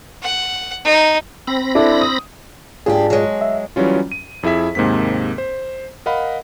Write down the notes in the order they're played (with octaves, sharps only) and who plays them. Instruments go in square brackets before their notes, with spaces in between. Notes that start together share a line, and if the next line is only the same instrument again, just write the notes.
[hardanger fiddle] F#5
D#4
[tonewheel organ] C4 B5 A#6
[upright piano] D4 E4 A4
D#6
[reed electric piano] G#2 F4 G#4 [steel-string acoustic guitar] D4 G4
[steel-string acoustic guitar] F#3 G#3
[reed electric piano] E5
[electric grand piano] E3 F#3 G3 C#4 F4
D#7
F2 E4 G#4 E5 B6
D#2 G#2 C3 A#3 C4 B6
C5
A#4 D#5 F5 F#5 B5